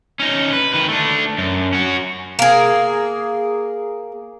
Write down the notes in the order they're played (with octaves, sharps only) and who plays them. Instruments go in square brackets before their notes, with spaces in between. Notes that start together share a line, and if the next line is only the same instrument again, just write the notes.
[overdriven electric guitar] C#4 D#4
B4
D#3 B4
A3 D4
F#2
C#4 F#4
[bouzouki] A#3 G#4